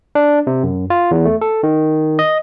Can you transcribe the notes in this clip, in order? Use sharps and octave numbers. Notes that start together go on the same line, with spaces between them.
D4
C3
F#2
F4
E2
A3
A4
D#3
D#5